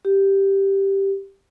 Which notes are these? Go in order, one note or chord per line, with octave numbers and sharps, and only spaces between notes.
G4